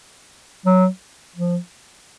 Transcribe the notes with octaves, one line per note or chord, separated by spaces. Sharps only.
F#3
F3